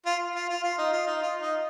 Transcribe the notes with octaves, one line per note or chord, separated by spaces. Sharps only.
F4
F4
F4
F4
D#4
F4
D#4
F4
D#4